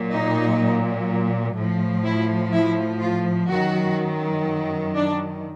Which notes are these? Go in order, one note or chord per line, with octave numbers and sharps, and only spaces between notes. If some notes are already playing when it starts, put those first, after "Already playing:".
Already playing: A#2 F#3
D#4
A2 F3
E4
E4
F4
F#2 D#3 F#3 F#4
D4